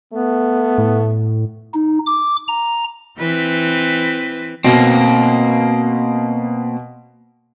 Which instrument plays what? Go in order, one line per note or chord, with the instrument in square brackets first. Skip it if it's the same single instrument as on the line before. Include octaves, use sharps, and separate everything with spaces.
[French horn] A3 [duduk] B3
[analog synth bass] A2
[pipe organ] D#4
D6
A#5
[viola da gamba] E3 C4 B4
[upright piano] B2 [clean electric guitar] A#3 C4